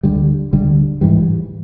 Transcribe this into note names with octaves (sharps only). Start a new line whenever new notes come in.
D2 D3 G3
D2 D3 G3
A1 G#2 E3 G3